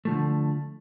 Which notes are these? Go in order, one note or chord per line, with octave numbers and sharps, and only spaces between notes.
D3 F3 A3